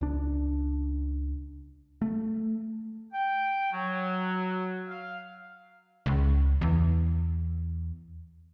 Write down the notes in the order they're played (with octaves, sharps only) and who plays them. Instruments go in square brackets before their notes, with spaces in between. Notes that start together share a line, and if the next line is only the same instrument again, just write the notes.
[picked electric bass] C#2 D4
A3
[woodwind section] G5
F#3
F5
[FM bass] C#2
E2